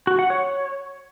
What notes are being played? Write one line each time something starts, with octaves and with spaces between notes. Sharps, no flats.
F#4
F#5
C#5